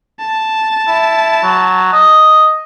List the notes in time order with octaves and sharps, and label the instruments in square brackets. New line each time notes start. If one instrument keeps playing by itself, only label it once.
[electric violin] A5
[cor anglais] E4
F#3
D#5